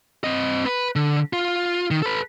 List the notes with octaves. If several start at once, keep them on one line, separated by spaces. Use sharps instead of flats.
C4 D#5
B4
D3
F4
D#3
A4 B4